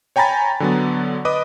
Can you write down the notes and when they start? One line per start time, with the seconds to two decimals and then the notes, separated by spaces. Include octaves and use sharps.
0.16 C#5 G5 G#5 A#5 B5 A6
0.60 D3 F#3 B3
1.25 B4 D#5 B5 D6 D#6